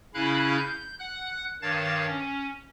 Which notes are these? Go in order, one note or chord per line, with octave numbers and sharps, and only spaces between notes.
C#3 C#4 E4 F5 B5 F#6
G6
F#5 F#6
G2 D#3 C#5 F5 A5 A6
C#4